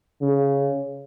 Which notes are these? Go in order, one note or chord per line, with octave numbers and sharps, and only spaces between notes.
C#3